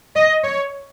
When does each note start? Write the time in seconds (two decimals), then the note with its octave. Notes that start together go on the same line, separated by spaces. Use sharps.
0.15 D#5
0.44 C#5